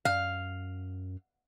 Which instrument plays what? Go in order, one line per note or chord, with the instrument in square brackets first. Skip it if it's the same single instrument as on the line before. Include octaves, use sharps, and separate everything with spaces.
[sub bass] F#2 [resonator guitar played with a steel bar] F5